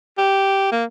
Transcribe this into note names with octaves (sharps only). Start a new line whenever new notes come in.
G4
A#3